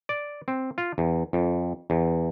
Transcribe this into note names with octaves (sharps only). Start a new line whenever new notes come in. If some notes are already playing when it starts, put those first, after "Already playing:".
D5
C4
F4
E2
F2
E2